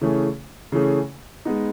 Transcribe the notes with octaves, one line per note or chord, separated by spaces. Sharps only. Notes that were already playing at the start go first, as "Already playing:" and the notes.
C#3 E3 A3 C#4 G#4
C#3 E3 A3 C#4 G#4
G#3 B3 D#4